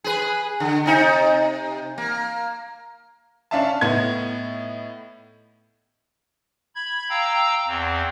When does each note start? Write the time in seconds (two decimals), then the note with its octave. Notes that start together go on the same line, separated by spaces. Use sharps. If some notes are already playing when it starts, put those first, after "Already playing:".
0.04 G#4 B4
0.60 D3
0.86 C3 D#4
1.98 A#3
3.51 C#4 D4 D5 E5 F5 A5
3.81 A2 B3 D#4 G#6
6.75 B5 G#6
7.10 F5 G5 A#5 E6
7.67 E2 C4